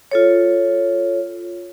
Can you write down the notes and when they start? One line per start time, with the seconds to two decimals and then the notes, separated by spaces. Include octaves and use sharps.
0.11 F4 A4 C#5